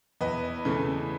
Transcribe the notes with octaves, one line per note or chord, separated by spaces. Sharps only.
E2 B4 D#5
C#3 E3 A3